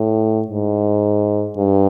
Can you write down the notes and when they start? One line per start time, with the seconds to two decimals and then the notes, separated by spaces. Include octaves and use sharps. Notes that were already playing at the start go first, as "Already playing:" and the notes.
Already playing: A2
0.47 G#2
1.58 G2